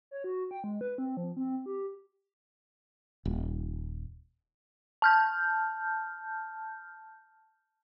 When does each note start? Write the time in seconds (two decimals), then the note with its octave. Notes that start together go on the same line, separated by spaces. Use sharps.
0.11 C#5
0.24 F#4
0.51 G5
0.64 G#3
0.81 B4
0.98 C4
1.17 F3
1.37 C4
1.66 G4
3.25 D#1
5.02 A5 F6 G6